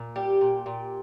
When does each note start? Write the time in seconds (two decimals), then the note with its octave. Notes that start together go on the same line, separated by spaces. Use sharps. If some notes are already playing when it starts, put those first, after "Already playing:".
Already playing: A#2
0.16 G3 G4
0.41 A#2
0.66 A#2